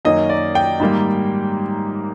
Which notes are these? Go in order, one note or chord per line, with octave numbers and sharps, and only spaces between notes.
F#2 D#3 F#3 A#3 D#5
D5
G5
G#2 D#3 G3 A#3